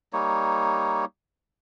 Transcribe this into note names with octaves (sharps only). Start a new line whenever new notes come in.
G3 A#3 D#4 C#5